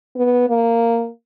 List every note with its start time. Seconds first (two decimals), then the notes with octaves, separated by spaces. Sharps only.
0.16 B3
0.49 A#3